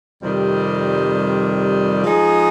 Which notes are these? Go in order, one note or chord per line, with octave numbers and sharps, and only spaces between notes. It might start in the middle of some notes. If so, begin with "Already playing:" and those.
F2 C3 D#3 G3
F3 G#3 D#4 G#4